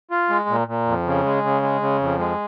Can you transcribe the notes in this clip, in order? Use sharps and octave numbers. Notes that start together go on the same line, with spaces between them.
F4
G#3
A#2
A#2
F2
C#3
G#3
C#3
G#3
C#3
F2
G#3